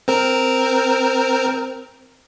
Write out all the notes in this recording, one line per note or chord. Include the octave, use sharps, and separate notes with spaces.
C4 A#4